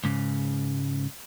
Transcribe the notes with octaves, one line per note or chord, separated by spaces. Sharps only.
C#2 G#2 C#3